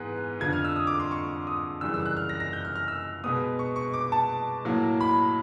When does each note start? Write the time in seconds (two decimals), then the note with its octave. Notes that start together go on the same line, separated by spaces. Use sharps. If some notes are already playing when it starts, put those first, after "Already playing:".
Already playing: G#2 E3 G#3 B3 F#6
0.40 F2 D3 F3 G#6
0.53 F6
0.65 E6
0.76 D#6
0.87 D6
1.00 C6
1.11 C#6
1.47 D#6
1.81 F#2 C#3 E3 G3 E6
1.94 E6
2.06 F#6
2.17 F6
2.29 A#6
2.40 A#6
2.53 G6
2.65 F6
2.76 F6
2.88 E6
3.24 B2 G#3 B3 D#6
3.59 C#6
3.76 C#6
3.93 D6
4.12 A5
4.65 A2 F#3 A#3
5.01 B5